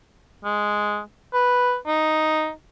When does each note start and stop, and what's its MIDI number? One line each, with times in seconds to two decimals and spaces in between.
0.45 1.00 56
1.34 1.76 71
1.87 2.50 63